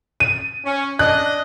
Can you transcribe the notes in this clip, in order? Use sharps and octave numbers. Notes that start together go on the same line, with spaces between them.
D#7
C#4
D4 D#5 F#6